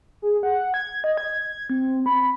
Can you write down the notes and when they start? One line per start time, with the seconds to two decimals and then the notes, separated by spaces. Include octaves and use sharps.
0.22 G#4
0.43 F#5
0.74 G#6
1.04 D#5
1.17 G#6
1.70 C4
2.06 B5